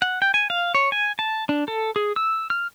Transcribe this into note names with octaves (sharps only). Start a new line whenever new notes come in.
F#5
G5
G#5
F5
C#5
G#5
A5
D4
A4
G#4
E6
F6